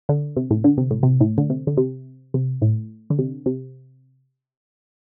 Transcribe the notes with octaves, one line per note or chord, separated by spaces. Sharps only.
D3
C3
A2
D3
C3
A2
C3
A2
D3
C3
D3
C3
C3
A2
D3
C3
C3